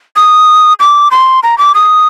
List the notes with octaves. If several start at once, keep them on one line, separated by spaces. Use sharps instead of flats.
D#6
D6
C6
A#5
D6
D#6